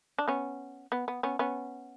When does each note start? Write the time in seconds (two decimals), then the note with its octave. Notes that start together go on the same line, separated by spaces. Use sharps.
0.18 D4
0.28 B3 C#4
0.92 B3
1.08 B3
1.23 B3 C#4
1.39 B3 C#4